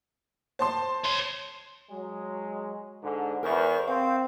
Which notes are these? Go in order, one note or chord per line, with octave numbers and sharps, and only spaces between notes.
C5 A5 C6
C#5 C6
F#3 G#3
G#2 D3
E2 A#4 C5 C#6
C4 F5